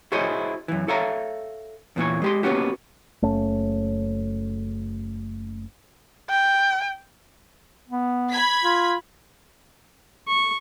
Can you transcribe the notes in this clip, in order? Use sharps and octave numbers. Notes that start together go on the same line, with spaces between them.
E4 F#4 G#4 C5 C#5 D#5
F#2 E3
A4 C#5 E5 F5 A#5
E2 A#2 E3 C#5
G#3 G4 C6
A#3 B3 C#4 F#4 G4
F#1 A3 C#4
G5
B3
B5 G#6 B6
F4
C#6